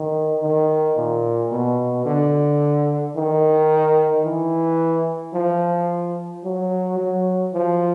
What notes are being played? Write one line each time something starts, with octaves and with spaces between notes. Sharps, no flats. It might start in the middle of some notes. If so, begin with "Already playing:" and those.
Already playing: D#3
D#3
A#2
B2
D3
D#3
E3
F3
F#3
F#3
F3